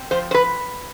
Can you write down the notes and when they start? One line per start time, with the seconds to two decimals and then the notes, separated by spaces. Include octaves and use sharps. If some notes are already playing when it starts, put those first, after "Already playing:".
Already playing: C4
0.11 F3 C5
0.31 C5
0.34 B4